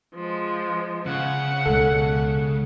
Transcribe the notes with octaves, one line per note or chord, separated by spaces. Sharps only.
F3 G#3
C#3 F#5
C#2 B2 G#3 A4